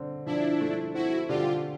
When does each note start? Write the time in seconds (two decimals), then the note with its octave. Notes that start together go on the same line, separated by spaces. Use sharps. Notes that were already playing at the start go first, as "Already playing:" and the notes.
Already playing: D3 C4
0.26 F3 D4 E4
0.61 A3
0.94 C4 E4 F#4
1.28 D3 F4 G4